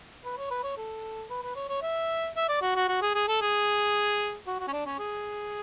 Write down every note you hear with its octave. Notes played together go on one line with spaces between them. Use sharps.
B4
C#5
B4
C#5
A4
B4
B4
C#5
C#5
E5
E5
D5
F#4
F#4
F#4
G#4
G#4
A4
G#4
F#4
F#4
C#4
D4
C#4
G#4